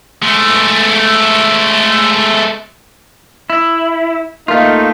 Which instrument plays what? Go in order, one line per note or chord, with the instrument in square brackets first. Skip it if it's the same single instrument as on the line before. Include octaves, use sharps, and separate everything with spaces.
[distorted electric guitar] G#3 A3
[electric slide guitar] E4
[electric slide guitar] A3 F4 [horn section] A#3 D#4